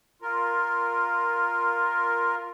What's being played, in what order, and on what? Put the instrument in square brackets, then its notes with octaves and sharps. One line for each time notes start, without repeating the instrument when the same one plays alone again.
[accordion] F4 A#4